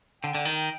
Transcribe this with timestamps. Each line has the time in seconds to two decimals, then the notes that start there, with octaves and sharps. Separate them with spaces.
0.23 D3 G5
0.35 D3
0.45 D#3